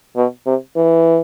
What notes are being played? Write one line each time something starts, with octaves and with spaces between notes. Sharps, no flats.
B2
C3
E3